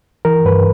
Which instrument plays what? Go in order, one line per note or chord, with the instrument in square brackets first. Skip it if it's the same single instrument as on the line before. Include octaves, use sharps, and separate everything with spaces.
[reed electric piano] E3 A#4
G2 B4